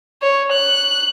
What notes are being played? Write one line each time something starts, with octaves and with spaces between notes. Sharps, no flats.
C#5
F#6